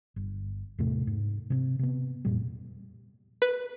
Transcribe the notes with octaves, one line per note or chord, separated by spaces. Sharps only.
G1
E2 A2 C3 A3
G#2
C3 B3 C4
C3 B3
F2 A#2 G3
B4